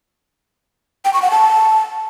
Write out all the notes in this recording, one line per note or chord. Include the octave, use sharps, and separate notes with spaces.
G5
C#6
F#5
A5